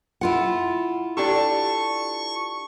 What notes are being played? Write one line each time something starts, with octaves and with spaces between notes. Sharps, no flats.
E4 F4 F#5
D4 G4 A4 C#6